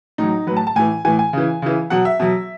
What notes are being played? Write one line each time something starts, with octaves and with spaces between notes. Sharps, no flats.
A2 F#3 D#4
A2 F#3 B4
A5
A5
A2 E3 G#5
A2 E3 G#5
G#5
C#3 E3
C#3 E3
B2 F#3 F#5
E5
B2 F#3